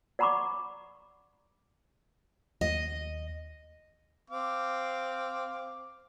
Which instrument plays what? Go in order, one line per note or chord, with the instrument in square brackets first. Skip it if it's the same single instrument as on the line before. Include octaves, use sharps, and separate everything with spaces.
[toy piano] D5 F#5 A#5 B5 C#6 D6
[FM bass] D#2 [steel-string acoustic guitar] D#5
[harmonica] C4 F5 D6